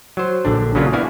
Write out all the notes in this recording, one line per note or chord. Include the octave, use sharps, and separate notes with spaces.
F#3 C5
A#1 D3 D4
C#3 F#3 A#3 C#4 D4 F4
B3 E4 F#4 D5 F5 G#5